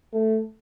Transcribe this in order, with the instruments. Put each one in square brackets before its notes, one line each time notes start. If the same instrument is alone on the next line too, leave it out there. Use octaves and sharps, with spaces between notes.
[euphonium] A3